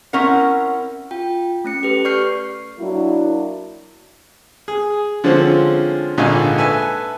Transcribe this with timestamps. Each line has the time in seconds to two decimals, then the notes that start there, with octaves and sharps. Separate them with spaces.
0.13 C4 C#4 E4 A#4 F#5
1.11 F4 G5
1.64 A3 C#4 C#7
1.83 G4 A4 B4
2.05 D5 C#6 F6 G6 C7
2.78 F#3 A#3 D4 E4
4.68 G#4
5.24 D3 F3 G#3 C4 C#4 C5
6.18 G#1 A#2 D3 D#4 F5 G#5
6.58 A4 B4 E5 G#5